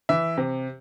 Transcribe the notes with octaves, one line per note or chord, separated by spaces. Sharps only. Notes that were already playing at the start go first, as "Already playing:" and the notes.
E3 E5
C3